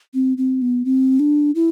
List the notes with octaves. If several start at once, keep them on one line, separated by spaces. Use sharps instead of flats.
C4
C4
B3
C4
D4
E4